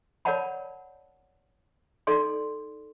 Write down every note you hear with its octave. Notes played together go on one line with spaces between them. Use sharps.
A#4 C#5 D5 F#5 A5 B5
D#4 A4 D5 C6